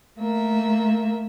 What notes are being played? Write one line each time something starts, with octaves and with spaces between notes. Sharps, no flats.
A3 A#3 E5